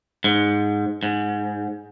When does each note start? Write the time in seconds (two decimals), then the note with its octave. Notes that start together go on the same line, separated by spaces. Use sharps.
0.24 G#2
1.03 G#2